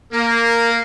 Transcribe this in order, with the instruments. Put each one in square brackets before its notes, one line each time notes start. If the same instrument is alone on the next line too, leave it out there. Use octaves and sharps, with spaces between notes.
[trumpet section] A#3 [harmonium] A#4